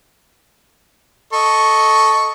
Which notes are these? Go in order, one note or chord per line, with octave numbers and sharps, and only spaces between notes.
A4 D#5 C#6